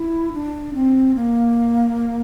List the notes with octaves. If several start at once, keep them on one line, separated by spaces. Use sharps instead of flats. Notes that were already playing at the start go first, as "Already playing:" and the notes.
Already playing: E4
D4
C4
A#3